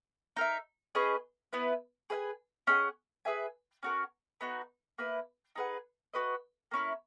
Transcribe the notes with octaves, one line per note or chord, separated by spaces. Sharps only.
D#4 A#4 E5
C#4 G#4 B4 D#5
B3 E4 B4
G#4 B4 E5 G#5
C#4 G#4 D#5 F#5
G#4 B4 E5 G#5
C#4 F#4 A#4
B3 D#4 F#4
A#3 E4 B4
D#4 G#4 B4 F#5
F#4 B4 D#5
A#3 C#4 E4